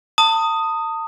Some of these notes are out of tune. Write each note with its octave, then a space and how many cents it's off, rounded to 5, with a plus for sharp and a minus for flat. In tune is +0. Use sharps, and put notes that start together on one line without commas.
A5 +35 D#6 +0